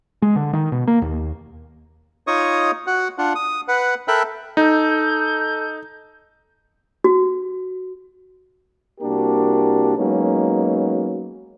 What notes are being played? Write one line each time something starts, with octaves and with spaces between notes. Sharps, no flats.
G#3
D3
D#3
B2
A#3
D#2
D#4 F4 C#5 D#5 C#6 D#6
F#4 F#5
D4 F4 F#5
D#6
B4 F#5
A4 A#4 E5 G5 B5 F#6
D#4 A4 A5 E6 G6
F#4
C2 A#3 D4 F#4 G4 A#4
F#3 G#3 A#3 B3 C#4 D#4